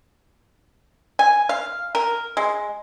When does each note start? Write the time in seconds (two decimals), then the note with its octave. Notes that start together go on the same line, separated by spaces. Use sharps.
1.19 G#5
1.49 F5
1.95 A#4
2.37 G#3